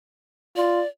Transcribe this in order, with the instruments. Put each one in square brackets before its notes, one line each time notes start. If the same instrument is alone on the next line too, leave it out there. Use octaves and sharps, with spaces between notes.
[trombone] F4 [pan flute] D5